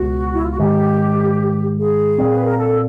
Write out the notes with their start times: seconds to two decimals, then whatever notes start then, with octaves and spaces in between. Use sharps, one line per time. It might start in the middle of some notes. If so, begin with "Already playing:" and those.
Already playing: C#2 B2 G#3 F#4
0.33 E4
0.42 F4
0.50 F#4
0.58 G#2 D#3 G#3 G4
1.79 G#4
2.18 A#2 G3 C4
2.32 B4
2.45 A#4
2.58 A4